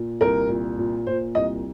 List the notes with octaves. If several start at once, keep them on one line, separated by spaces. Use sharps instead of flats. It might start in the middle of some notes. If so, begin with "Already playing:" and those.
Already playing: A#2
C2 A#4
A#2
A#2
A#2 C5
C2 D#5